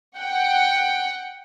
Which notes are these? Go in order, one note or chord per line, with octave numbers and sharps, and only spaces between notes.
F#5 G5